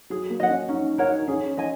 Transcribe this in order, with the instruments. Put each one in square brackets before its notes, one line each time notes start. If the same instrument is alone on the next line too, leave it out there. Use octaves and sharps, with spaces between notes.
[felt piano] F#3 [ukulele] G#4
[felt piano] A#3
[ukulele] D#5 F#5
[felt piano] C#4
[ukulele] C#4 [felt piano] D#4
[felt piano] D#4 [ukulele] A#4 C#5 F#5
[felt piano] D#4
[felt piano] C#4 [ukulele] G#4
[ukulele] D#5 G#5